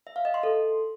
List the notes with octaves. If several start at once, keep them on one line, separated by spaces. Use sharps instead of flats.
E5
F5
D#5
C6
A4